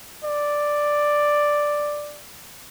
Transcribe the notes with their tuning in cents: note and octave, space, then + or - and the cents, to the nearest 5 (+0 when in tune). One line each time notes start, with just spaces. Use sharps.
D5 +5